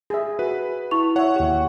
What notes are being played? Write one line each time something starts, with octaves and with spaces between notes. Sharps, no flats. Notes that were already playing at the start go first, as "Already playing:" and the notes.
G#4 E5
F#4 B4
E4 C#6 F7
C#5 E5 F#5
D#2 G4